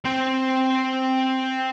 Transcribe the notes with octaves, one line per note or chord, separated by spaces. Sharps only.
C4 C5